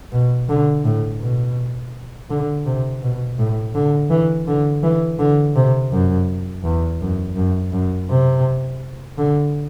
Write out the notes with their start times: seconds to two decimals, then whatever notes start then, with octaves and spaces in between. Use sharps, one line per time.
0.12 B2
0.49 D3
0.85 A2
1.21 B2
2.30 D3
2.65 C3
3.02 B2
3.39 A2
3.75 D3
4.10 E3
4.47 D3
4.83 E3
5.19 D3
5.56 C3
5.92 F#2
6.64 E2
7.01 F#2
7.36 F#2
7.72 F#2
8.09 C3
9.18 D3